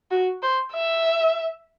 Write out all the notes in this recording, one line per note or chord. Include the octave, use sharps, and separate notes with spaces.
F#4
C5
E5